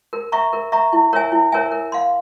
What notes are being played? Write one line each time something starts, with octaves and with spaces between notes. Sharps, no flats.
A#4
E5 A#5 C#6
A#4
E5 A#5 C#6
E4
A#4 C#5 E5 G#5
E4
A#4 C#5 E5 G#5
A#4
F5 C6